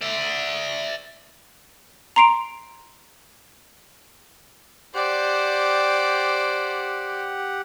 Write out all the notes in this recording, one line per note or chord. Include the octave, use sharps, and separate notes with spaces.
D5 E5
A#5 C6 C7 D7 F7
G4 C5 D5 F#5